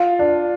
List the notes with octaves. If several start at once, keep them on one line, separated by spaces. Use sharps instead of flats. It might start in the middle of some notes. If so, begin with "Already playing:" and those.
Already playing: F4
D4